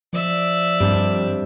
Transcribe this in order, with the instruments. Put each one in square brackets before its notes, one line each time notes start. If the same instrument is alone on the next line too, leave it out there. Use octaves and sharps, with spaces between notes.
[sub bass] F3 [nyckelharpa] D5 E5
[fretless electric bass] G2 [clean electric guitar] G3 C4 D4